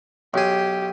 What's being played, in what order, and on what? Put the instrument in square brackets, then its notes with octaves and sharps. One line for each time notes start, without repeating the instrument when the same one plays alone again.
[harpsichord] B1 G#4 [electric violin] G4